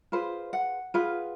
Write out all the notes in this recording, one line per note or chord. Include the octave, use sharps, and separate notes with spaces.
F4 G#4 B4 C5
F#5
F4 G#4 B4